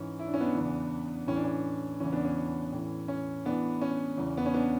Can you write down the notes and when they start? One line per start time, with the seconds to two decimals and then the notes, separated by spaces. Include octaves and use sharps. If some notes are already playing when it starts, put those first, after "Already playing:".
Already playing: G#2 E3 C#4
0.19 E4
0.27 D4
0.34 C#4
0.41 B3 D4
0.55 E2 C#3 E3
1.27 A2 E3 C#4
1.36 D4
1.44 C#4
2.00 E2 C#3 E3 C#4
2.12 B3 D4
2.24 C#4
2.73 A2 E3
3.08 C#4
3.45 A2 E3 B3 D4
3.81 C#4
4.18 E2 C#3 E3
4.37 B3
4.46 C#4
4.54 B3 D4